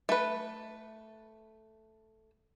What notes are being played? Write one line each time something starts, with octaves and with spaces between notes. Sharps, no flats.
A3 B4